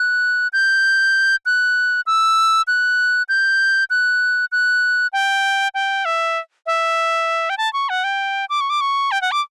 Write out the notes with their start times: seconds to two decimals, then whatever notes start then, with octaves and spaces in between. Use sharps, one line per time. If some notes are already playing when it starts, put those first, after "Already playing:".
Already playing: F#6
0.53 G6
1.46 F#6
2.07 E6
2.68 F#6
3.29 G6
3.90 F#6
4.52 F#6
5.13 G5
5.74 G5
6.05 E5
6.66 E5
7.50 G5
7.58 A5
7.73 C#6
7.89 F#5
8.04 G5
8.50 D6
8.61 C#6
8.70 D6
8.81 C#6
9.11 G5
9.22 F#5
9.32 D6